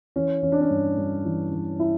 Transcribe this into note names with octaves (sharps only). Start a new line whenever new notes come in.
E3 C#4
E3 C#4
D4
C#4
G2
G2
E3
E3
E4